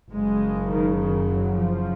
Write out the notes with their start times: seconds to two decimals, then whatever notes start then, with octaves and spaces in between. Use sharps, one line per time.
0.13 F#1 F#2 C#3 G#3
0.70 D#3
0.98 D#3
1.27 F#3
1.56 F3